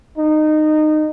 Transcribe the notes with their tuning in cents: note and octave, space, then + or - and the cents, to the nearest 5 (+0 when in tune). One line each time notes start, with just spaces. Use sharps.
D#4 -20